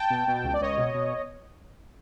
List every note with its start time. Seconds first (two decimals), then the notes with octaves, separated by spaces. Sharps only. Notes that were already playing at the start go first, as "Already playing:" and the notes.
Already playing: G5 A5
0.10 B2
0.28 B2
0.44 C#2
0.54 D5
0.61 C#2 C#5 D#5
0.77 B2
0.94 B2